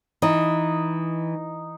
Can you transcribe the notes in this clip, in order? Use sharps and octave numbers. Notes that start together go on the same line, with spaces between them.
E3 D#4